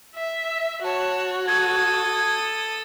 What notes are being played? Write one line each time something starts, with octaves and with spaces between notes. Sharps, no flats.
E5
F#4 C#5 A5
A4 D#6 G#6